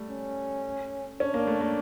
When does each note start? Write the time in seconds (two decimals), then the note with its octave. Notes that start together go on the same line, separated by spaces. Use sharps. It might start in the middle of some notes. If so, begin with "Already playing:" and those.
Already playing: G3 A3
0.09 C#4
1.20 C#4 D4
1.34 A#3
1.47 A3
1.61 A#3